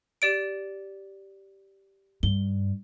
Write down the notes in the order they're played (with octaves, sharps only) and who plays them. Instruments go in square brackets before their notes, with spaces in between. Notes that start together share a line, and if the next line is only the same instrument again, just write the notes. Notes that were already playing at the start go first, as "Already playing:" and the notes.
[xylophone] G4 D5 D7
[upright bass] G2 [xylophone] G7